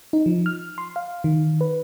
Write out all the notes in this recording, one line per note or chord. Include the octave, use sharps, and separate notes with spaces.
D#4
F3
F6
C6
F5
D#3
B4